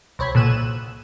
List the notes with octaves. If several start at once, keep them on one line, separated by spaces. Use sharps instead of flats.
C2 C5 C#5 B5 G#6
B1 A#2 E6 F#6 D#7 E7